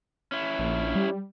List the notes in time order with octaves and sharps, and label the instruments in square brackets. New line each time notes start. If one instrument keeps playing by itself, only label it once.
[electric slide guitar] C#4 E4
[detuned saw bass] A#1
G3